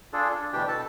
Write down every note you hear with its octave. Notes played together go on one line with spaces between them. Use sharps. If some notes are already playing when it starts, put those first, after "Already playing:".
D4 F4 G#4 A4
D4
D2 B2 E3 D4 G4 G5
B2 A4 A5